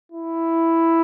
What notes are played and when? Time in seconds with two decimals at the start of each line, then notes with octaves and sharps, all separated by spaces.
0.12 E4